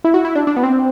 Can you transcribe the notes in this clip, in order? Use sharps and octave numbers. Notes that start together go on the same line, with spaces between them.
E4
F#4
E4
D4
D4
B3
C4